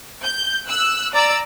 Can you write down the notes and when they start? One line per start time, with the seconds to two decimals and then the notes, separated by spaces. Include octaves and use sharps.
0.23 G6
0.69 E6 F#6
1.14 D5 A#5 E6